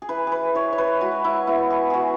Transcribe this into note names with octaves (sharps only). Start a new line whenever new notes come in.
G#4
E3 B4
G#4 B4
E3 C#5
C#5
B4
G#3 F#4
E4
B3 E4
G#4
E3 F#4 G#4